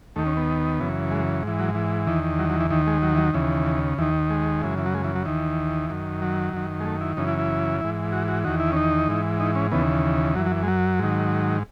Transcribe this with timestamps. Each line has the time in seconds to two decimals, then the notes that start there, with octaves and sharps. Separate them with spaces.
0.16 D#2 A3
0.18 D#3
0.26 C#4
0.37 B3
0.80 F#2 C#3 E3
1.11 G#3
1.43 G#2 E3
1.59 F#3
1.75 E3
2.07 E2 D#3
2.39 F#3
2.49 F#3
2.60 E3
2.71 D#2 D#3 E3
2.87 G#3
3.02 F#3
3.14 E3
3.18 F#3
3.34 D#2 C#3 E3
3.98 D#2 D#3 E3
4.30 G#3
4.62 F#2 C#3 E3
4.78 E3
4.86 F#3
4.94 G#3
5.04 E3
5.15 F#3
5.25 D#2 D#3 E3
5.89 F#2 D#3
6.22 F#3
6.53 F#2 D#3
6.80 G#3
6.85 A3
7.01 E4
7.17 F#2 C#3 E3 D#4
7.27 E4
7.38 E4
7.81 G#2 E3
8.12 F#4
8.28 F#4
8.44 E2 D#3 F#4
8.60 E4
8.72 C#4
8.77 D#4
9.08 G#2 E3
9.40 D#4
9.55 C#4
9.71 D#2 C#3 E3 B3
10.35 F#2 E3 F#3
10.46 F#3
10.51 E3
10.63 G#3
10.68 F#3
10.99 G#2 D#3